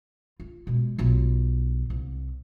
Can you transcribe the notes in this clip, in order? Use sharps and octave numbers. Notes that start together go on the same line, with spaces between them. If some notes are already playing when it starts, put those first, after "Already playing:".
F4
B2 G#3
B1 F4
C2